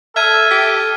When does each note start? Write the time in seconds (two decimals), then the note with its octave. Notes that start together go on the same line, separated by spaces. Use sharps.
0.16 A4 E5 F6 G#6 D#7
0.51 G4 B6